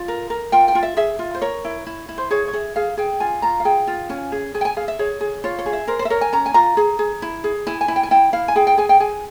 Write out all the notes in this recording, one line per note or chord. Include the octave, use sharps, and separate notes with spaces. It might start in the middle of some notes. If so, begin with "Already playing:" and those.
Already playing: F4
A#4
A#4
F4 G5
G5
F4
E5
G#4 E5
F4
C5
A#4 C#5
E4
E4
E4
C5
G#4 C#5
C#5
G#4 E5
G#4 F5
G#4 G5
F4 G#5
F4 A#5
F5
G#4 G5
F4
C#4 G#5
G#4
G#4 G#5
G5
G#5
G#4 F5
E5
G#4 C#5
G#4
F4 C#5
C#5
G#4
E5
A#4 C5
C5
E5
A#4 C#5
G#5
C#4 A#5
G#5
F4 A#5
G#4
G#4
E4
G#4
E4 G#5
G#5
E4
G5
G#5
E4 G5
E4 F5
G#5
G#4 G5
G5
G#4 G#5
G5
G#4 G#5